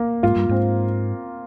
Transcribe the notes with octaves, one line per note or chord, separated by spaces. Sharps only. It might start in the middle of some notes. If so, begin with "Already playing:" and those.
Already playing: A#3
G#2 F4
G2
G#2 C4